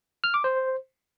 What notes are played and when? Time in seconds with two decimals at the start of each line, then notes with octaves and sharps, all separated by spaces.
0.24 F6
0.34 D6
0.44 C5